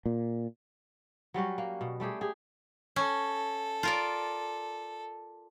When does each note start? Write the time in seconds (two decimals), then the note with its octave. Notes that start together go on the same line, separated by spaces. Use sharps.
0.06 A#2
1.34 F#3 G3 C#4 F#4
1.58 A#3
1.81 B2
2.00 G3 A3 G4 G#4
2.21 G4 G#4
2.96 C#4 A4
3.83 F4 A#4 D5